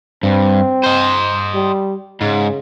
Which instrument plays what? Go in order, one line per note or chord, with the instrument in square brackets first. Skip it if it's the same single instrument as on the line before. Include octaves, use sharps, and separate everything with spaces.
[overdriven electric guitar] G2 [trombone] C4
[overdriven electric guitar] C5 D#5
[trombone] G3
[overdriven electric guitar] G#2 [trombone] C#3